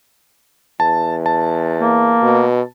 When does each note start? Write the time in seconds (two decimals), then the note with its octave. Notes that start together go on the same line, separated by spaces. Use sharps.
0.80 E2 A5
1.26 A5
1.81 A#3
2.23 B2